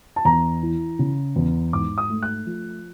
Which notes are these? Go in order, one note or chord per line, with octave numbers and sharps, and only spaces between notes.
A5
E2 A#5
E3
C#3
E2
G#2 D6
D#6
A3
F#6
F3